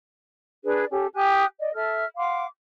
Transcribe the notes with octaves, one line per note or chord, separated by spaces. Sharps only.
D4 G#4 B4 D5
C#4 G4 A4
G4 G#5 D#6 F#6
D5 D#5
A4 E5 F6
F5 F#5 C6 D6